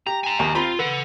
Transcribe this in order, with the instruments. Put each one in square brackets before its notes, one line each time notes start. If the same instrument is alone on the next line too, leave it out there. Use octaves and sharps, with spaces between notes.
[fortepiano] G4 [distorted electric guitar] A#5
[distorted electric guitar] G#5 A#5
[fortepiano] A#1 D#2
[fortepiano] C4 A#5 B5 [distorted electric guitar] F4
[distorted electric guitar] A4 F#5 [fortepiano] B4